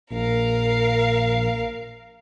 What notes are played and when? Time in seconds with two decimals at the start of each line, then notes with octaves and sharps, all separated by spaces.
0.11 A#1 A#4 F5